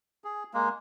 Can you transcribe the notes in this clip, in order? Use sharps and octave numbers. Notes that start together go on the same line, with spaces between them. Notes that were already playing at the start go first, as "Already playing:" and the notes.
G#4
G#3 A#3